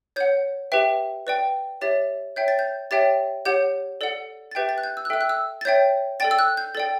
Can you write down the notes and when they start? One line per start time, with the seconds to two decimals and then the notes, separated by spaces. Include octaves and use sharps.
0.16 C#5 F#5 G6
0.72 G4 B4 E5 G5
1.27 B4 D5 G5
1.81 G4 C#5 E5 A6
2.36 C#5 E5 G5 G6
2.48 A6
2.59 G6
2.91 G4 C#5 E5 G5 A6
3.45 G4 C#5 F#5 G6
4.01 A4 D5 F#5
4.51 A6
4.55 G4 B4 E5 G5 G6
4.69 A6
4.78 F#6
4.84 G6
4.97 E6
5.05 F#6
5.10 A4 E5 G5 E6
5.21 F#6
5.29 E6
5.61 A6
5.65 C#5 E5 G5 G6
6.20 A4 D5 G5 A6
6.31 E6
6.39 F#6
6.57 G6
6.75 A4 D5 G5 A6